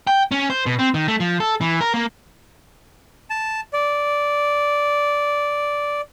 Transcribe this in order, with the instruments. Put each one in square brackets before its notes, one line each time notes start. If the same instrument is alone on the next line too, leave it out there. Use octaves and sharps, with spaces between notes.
[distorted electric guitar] G5
C#4
C5
B2
C4
D#3
A3
F3
A4
E3
A#4
A#3
[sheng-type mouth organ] A5
D5